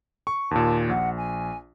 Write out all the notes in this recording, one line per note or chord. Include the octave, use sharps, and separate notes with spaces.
C#6
D#2 A#2 A5
A#1 F#5
G#5